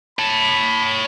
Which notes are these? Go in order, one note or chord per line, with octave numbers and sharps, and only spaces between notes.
C#5 A5 B5